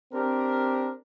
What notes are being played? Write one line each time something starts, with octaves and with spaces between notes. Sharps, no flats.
C4 D4 G4 A#4